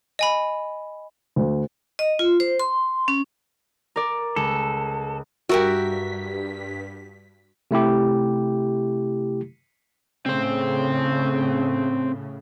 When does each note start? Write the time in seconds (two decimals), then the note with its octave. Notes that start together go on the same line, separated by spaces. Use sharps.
0.19 D#5 G#5 B5
1.36 D2
1.99 D#5
2.19 F4
2.40 C5
2.59 C6
3.08 C#4
3.96 A#4 D5
4.36 C#2 A4
5.49 G2 F#4 G4 A#4 E5 B6
7.71 C3 A3 E4 G4
10.26 A2 C#3 C4 C5